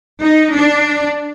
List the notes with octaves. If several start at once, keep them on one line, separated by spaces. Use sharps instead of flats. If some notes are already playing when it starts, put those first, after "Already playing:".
D#4
D4